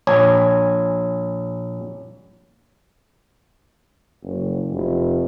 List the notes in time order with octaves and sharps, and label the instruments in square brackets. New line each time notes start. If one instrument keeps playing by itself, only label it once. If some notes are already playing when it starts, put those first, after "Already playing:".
[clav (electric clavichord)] A#1 G#5 [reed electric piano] C#5
[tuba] F#1
F1